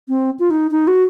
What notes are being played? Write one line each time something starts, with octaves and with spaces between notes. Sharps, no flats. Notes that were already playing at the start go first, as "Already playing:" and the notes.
C4
F4
D#4
D#4
F#4